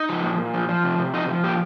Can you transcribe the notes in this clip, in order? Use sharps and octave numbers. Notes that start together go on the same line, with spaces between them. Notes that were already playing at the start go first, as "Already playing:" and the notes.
Already playing: D#4
F3
A#2
A#2
F3
F3
C3
C3
F3 D#4
F3
A#2 G4